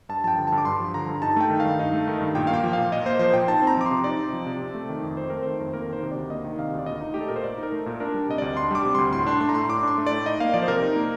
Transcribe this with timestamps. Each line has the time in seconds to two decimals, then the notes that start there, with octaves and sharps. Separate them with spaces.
0.09 G2 A5
0.24 F3 A5
0.28 G5
0.38 D3
0.47 G2 A5
0.58 D6
0.65 G2 C6
0.80 F3
0.94 D3 A#5
1.09 G2
1.22 D#4 A5
1.36 A3 G5
1.50 D#3
1.60 F5
1.65 G2
1.79 D#4
1.93 A3
2.08 D#3
2.21 G2
2.35 A#2 G5
2.47 F5
2.50 A#3 G5
2.63 F3
2.73 A#2 F5
2.92 A#2 D#5
3.06 A#3 C5
3.19 F3 C5
3.34 A#2 G5
3.48 D#4 A5
3.62 C4
3.67 A#5
3.77 F3 D6
3.86 C6
3.91 C3
4.04 D#4 D5
4.19 C4
4.33 F3
4.46 C3
4.62 C4
4.75 A3
4.89 D#3
5.03 F2
5.17 C4 C5
5.30 A3 A#4
5.43 D#3 C5
5.60 F2
5.73 A#3 A#4
5.88 D#3 C5
6.03 C3
6.11 D5
6.16 D2
6.30 A#3 D#5
6.44 D#3
6.59 C3 F5
6.74 D2
6.79 D5
6.86 A#2 D#5
7.01 D#4
7.14 A3 G4
7.21 A4
7.28 A#2 A#4
7.36 C5
7.44 A#2 D5
7.58 D#4 A#4
7.72 A3
7.86 A#2
8.00 D4 A#4
8.14 G3
8.29 C3 D#5
8.38 D2 D5
8.57 D4 C6
8.71 G3 D6
8.85 C3
8.95 D2 C6
9.13 A2 C6
9.26 D4 C6
9.41 A3 C6
9.49 A#5
9.55 A2 C6
9.69 A2 D6
9.83 D4 C6
9.98 A3
10.07 D5
10.12 A2
10.26 D#4 D#5
10.40 A#3 F5
10.54 F3 D5
10.62 C5
10.68 C3 A#4
10.82 D#4
10.96 A#3